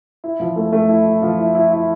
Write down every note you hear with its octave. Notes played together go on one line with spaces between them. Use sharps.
E4
F3
A3
A3
E4
E4
F3
E4
E4
E4